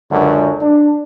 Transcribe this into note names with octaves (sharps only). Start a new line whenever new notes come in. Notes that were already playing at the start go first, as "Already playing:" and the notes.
C#2 F#2 D3
D4